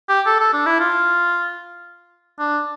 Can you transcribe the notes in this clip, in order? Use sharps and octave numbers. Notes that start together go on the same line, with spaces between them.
G4
A4
A4
D4
E4
F4
D4